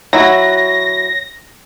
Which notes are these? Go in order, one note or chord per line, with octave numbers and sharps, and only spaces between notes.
F#3 E4 F#4 A#6